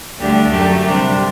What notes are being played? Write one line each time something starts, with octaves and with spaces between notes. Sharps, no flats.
D2 D3 G3 D4 G4
F#2 F#3 A3 G4
C3 G3 D4 G4